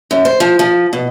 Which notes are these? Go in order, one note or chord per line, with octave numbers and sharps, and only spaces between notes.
F#2
C5
F3
F3
B2